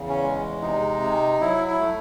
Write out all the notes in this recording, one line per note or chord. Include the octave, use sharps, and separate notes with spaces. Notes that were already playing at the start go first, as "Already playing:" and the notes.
Already playing: E2 C#3
C#4
G#3
C3 D#4
C3
F#3 E4
E4
A3